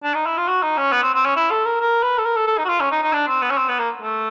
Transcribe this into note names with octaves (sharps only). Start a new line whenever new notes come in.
D4
D#4
E4
F4
F#4
D#4
C#4
B3
C4
C4
C#4
E4
A4
A#4
A#4
B4
A4
A#4
A4
A4
D#4
F#4
F4
C#4
D#4
D#4
D4
C4
B3
C#4
C4
B3
A#3
A3